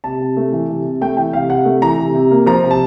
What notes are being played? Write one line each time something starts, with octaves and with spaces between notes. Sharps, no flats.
C3 A5
C3
A3
E3
C3
C3
A3 G5
E3 G5
C3 F5
C3 F#5
A3
E3 A#5
C3
C3
A#3
F3 A#5
C3
A5